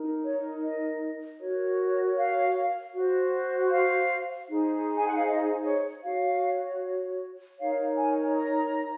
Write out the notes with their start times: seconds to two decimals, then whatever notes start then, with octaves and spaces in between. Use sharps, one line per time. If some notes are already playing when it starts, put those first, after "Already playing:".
Already playing: D#4 A#4
0.23 C#5
0.62 D#5
1.40 F#4 A#4 C#5
2.16 F5
2.94 F#4 C5
3.72 F5
4.48 D#4 G#4 C5
4.96 G#5
5.07 F#5
5.16 F5
5.26 D#5
5.65 C#5
6.03 F#4 C#5 F5
7.58 D#4 A#4 C#5 F5
7.97 G#5
8.35 A#5